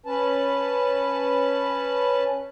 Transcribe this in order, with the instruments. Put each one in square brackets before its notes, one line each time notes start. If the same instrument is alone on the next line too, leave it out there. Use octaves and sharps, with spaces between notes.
[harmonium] C#4 B4 A5